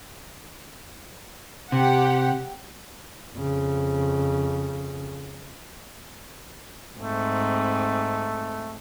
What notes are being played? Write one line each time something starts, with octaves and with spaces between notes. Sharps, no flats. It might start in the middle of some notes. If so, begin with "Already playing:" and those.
C3 G4 F#5
F2 C#3
G#2 A3 C4